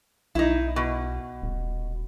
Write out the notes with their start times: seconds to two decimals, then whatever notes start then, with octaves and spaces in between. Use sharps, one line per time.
0.35 B1 D#4 E4
0.76 B2
1.42 D#1